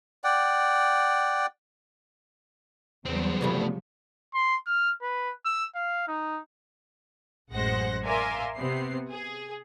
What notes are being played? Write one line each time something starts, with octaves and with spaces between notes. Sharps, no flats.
D5 F#5 G5
E2 C#3 F#3 G3 B3 C4
E2 G2 C3 F3 A3
C6
F6
B4
E6
F5
D#4
A1 F#2 G#3 C5 F#5 A#6
A#4 D5 E5 F5 G#5 C6
C3 B3 C4 C7
G#4